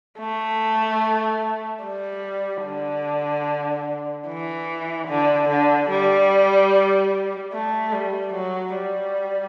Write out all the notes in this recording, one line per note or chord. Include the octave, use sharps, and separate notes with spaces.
A3
G3
D3
E3
D3
D3
G3
A3
G3
F#3
G3